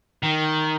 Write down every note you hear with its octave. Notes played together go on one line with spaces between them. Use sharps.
D#3